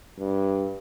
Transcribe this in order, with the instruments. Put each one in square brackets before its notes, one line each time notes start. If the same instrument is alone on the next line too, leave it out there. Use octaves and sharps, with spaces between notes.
[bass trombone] G2